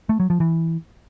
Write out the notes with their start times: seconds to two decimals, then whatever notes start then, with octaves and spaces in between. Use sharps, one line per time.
0.09 A3
0.20 F#3
0.30 F3
0.40 E3